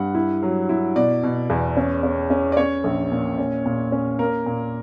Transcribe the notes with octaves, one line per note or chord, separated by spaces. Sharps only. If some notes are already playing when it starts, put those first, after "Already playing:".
Already playing: G2 F#5
E4
F#3
E4
B2 D5
B2
E2
C#4
C#4
C#4
D5
C#4 C#5
A#1
A#2
C#4
A#2
C#4
A#3 A#4
A#2